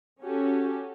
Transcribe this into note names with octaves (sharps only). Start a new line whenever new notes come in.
C#4 F#4 G4 A4